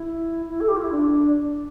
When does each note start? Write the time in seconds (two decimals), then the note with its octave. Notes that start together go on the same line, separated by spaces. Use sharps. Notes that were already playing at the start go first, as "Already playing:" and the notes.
Already playing: E4
0.49 E4
0.61 A4
0.68 G4
0.76 F4
0.84 E4
0.91 D4